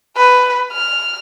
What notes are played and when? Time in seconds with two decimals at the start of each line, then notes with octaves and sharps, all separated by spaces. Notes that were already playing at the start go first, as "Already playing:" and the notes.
0.16 B4
0.72 F6